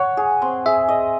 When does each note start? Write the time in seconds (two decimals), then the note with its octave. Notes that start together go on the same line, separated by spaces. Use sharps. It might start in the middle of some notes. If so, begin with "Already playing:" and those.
Already playing: C#5 F#5
0.17 G#4
0.42 C4
0.66 G#4 E5
0.88 D#5